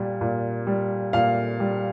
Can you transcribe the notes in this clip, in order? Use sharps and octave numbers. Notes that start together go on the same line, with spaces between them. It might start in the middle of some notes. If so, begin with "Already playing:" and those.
Already playing: A#2 G3
A#2
G3
A#2 F5
G3